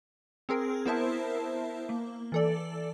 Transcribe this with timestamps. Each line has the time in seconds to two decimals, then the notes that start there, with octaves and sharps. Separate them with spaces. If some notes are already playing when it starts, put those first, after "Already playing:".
0.49 C4 G#4 A#4
0.86 B3 E4 A#4 C5 E5 A5
1.89 A#3
2.32 E3 A4 D5